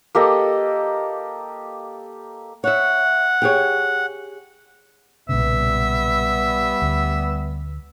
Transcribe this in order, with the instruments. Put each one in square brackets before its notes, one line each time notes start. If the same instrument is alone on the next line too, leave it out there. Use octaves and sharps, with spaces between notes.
[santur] A#3 G4 A4 D#5
[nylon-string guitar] C#5 E5 [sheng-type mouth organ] F#5
[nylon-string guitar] G4 G#4 C#5
[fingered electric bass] B1 A#2 C#3 [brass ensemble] G3 B3 [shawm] E5
[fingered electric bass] D2